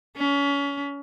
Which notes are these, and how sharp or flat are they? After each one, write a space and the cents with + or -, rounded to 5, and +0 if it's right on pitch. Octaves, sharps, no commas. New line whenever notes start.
C#4 +30